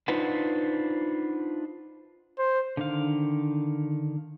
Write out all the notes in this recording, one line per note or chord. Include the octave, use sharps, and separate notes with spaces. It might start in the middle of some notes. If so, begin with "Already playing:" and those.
D4 D#4 F4 B4 C5 F#5
C5
D3 D#3 F5